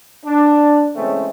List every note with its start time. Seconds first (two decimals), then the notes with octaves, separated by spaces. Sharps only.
0.24 D4
0.96 C#3 E3 G#3 A3 C4 C#4